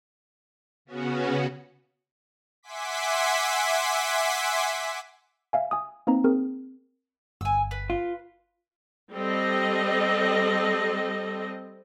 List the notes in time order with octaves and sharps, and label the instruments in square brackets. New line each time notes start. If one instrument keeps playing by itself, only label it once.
[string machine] C#3 B3 C#4 F#4
[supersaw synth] E5 F#5 G#5 C6 D6 B6
[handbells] E5 F5 G#5
G#5 D#6
A#3 C4 D#4 B4 A#5
C4 G#4 A#4
[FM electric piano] G1 [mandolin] G#5 E6
[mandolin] B4
[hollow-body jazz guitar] F4
[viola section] G3 C4 A4 D#5